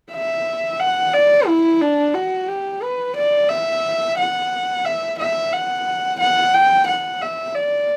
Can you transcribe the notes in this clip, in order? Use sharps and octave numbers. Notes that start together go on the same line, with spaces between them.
E5
F#5
D5
E4
D4
F#4
G4
B4
D5
E5
F#5
E5
E5
F#5
F#5
G5
F#5
E5
D5